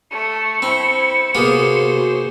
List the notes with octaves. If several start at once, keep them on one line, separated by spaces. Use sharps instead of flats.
A3 C#7
C4 E4 C5
C3 A#3 B3 F#4 G#4 C5